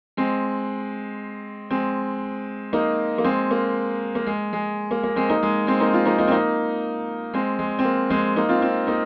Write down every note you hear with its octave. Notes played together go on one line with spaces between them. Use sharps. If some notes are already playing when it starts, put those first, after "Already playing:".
G#3 C4
G#3 C4
A#3 D#4
A#3
G#3 C4
A#3
A#3
G#3
G#3
A#3
A#3
G#3 C4
A#3 D#4
G#3
G#3 C4
A#3 D#4
C4 F4
A#3 D#4
A#3 D#4
C4
A#3 D#4
G#3 C4
G#3
C4
A#3
G#3 C4
A#3 D#4
C4 F4
C4 F4
A#3 D#4